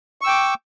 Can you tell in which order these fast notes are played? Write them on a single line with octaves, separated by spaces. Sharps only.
C#6 E6 G5 D6